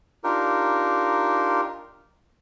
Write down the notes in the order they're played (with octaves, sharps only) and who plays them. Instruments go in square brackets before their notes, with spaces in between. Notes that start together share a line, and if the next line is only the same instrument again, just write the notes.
[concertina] D4 D#4 F4 G4 A#4